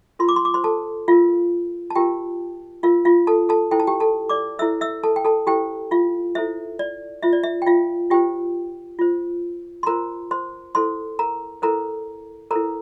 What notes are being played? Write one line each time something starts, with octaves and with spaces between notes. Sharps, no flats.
F4 A#4 C6
D6
C6
D6
C5 C6
A4 A5
F4 A#4 F5
A5
F4 G4 A#4 G5
F4 A#4 F5
F4 F5
A4 A5
A4 A5
E4 A4 C5 G5
A5
G4 G5
A4 A5
D5 D6
E4 A4 C5 E5 E6
E5 E6
A4 A5
G5
A4 A5
E4 G4 A4 C5 G5
F4 F5
E4 A4 C5 E5
D5
F4 C5 E5
D5
E5
G5
F4 F5
F4 G4 C5 G5
F4 C5
C6
F4 A#4 C5 A#5
C5 C6
E4 A4 C5 C6
A#4 A#5
E4 A4 A#4 C5 A#5
E4 A4 A#4 C5 A#5